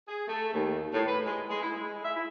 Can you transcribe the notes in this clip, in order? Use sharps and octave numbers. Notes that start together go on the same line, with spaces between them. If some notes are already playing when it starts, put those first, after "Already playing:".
G#4
A3
D#2
A2
B4
G#3
G#3
E4
G#3
E5
E4